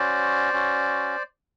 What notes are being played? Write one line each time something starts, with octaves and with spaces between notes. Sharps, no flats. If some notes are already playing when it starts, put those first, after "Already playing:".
Already playing: C#4 F#4 C5 D5
C#4 F#4